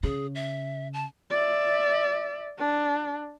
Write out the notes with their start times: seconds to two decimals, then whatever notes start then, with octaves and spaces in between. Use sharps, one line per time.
0.03 C#3 G#4
0.35 E5
0.93 A5
1.30 D5 E5
2.58 D4